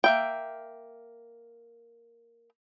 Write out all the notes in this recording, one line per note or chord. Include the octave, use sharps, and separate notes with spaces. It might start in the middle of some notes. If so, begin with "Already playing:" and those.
A#3 E5 G5